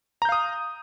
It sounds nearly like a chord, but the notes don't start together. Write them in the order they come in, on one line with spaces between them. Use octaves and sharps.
A#5 G6 F5 D#6